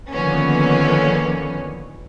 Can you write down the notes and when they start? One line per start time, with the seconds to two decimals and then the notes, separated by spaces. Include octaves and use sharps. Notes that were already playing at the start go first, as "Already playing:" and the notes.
0.11 D3 D#3 F3 A#3 B3 C#4